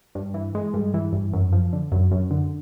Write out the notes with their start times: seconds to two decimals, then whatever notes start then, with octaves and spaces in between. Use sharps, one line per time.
0.15 G2
0.34 E3
0.55 G#3
0.74 G2
0.94 E3
1.13 G2
1.33 F#2
1.52 F3
1.73 D3
1.92 F#2
2.12 F#2
2.31 D3